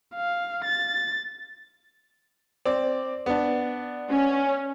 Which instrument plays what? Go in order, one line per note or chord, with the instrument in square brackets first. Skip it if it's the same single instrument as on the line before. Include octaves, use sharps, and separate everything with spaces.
[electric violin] F5
A6
[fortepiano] C4 D5
B3 D4
[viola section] C#4